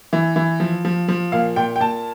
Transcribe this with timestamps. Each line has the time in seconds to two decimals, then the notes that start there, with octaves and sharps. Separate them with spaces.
0.13 E3
0.36 E3
0.60 F3
0.85 F3
1.08 F3
1.32 A#2 F5
1.56 A#2 G5
1.76 G5
1.80 A#2 A5